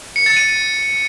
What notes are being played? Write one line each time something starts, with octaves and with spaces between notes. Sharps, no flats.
C#7
A6
D#7